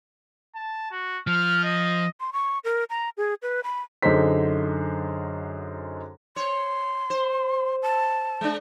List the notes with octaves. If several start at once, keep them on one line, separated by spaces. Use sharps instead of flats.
A5
F#4
F3 F6
D#5
C6
C#6
A#4
A#5
G#4
B4
B5
F#2 D3 D#4 G#4 C5 B6
C#5 C6
C5
A5
G#3 D4